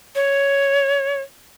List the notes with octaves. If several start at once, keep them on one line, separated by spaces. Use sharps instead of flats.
C#5